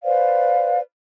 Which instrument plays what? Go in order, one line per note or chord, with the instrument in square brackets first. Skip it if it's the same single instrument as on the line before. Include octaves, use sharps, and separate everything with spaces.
[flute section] B4 C5 D5 F5